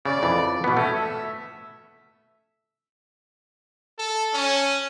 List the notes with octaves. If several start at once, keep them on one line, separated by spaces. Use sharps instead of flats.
C#3 D5
F2 E3
B2 B3
A3 C#4
E5
A4
C#4